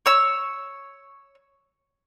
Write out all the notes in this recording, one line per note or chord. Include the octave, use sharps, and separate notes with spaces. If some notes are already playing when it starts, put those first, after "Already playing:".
C#5 E6